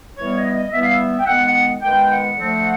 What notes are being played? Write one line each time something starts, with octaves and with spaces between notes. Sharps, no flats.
E3 G3 B3 C#5
D#5
D#5
E3 G3 B3 E5
F5
E5
G5
D#3 G#3 B3 F#5
F#5
D#3 G#3 B3 G5
F#5
D3 F3 A3 C4